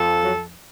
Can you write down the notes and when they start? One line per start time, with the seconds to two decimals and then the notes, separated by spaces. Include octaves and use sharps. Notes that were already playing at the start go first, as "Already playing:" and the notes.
Already playing: F2 F3 A4
0.23 F#3